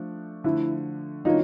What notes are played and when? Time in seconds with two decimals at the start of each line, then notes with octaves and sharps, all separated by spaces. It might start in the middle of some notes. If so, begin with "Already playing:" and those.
Already playing: F3 A3 D4
0.44 D3 F3 A3 E4
1.25 D3 F#3 A#3 C#4 D#4 F4